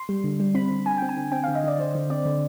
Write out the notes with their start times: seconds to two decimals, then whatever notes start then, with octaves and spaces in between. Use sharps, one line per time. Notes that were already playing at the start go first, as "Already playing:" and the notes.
Already playing: C6
0.09 G3
0.24 D3
0.40 G3
0.55 C4 B5
0.71 D3
0.86 D3 G#5
0.97 C4 G5
1.09 G#5
1.17 D3
1.32 C4 G5
1.44 D3 F5
1.55 D#5
1.64 D3 D5
1.79 D3 C5
1.95 D3
2.10 C4 D5
2.25 D3